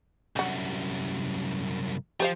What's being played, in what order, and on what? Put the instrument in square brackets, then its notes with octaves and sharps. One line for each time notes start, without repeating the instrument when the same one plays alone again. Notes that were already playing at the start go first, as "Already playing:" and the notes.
[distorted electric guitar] C2 F#2 [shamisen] D4 F#4
[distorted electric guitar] F3 [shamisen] G4 C5 F5